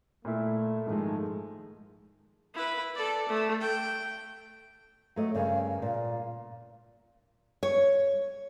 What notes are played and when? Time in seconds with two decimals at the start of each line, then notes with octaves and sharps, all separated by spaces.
0.25 A#2 A3 E4
0.86 G#2 D#3 F3 G#3 A3
2.55 E4 B4
2.95 A4 D5
3.29 A3
3.61 G5
5.16 F#3 A3 D#5
5.35 G2 C#3 A#3
5.82 A#2
7.63 C#5